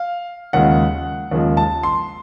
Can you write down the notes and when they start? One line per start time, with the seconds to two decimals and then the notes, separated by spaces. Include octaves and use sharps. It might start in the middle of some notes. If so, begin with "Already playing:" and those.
Already playing: F5
0.53 D#2 C#3 F3 G#3 F#5
1.31 D#2 C#3 F3 G#3
1.57 A5
1.83 C6